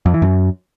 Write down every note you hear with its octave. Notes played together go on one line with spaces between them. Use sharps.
F2
E3
F#2